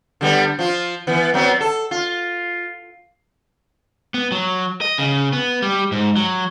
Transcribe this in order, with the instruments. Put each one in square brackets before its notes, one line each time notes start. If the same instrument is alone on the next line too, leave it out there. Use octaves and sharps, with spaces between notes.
[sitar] D3 G3 B3
F3 F4
E3 B3
F#3 B3 C4
A4
F4
[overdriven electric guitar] B3
F#3
D#5
C#3
B3
G3
G#2
F#3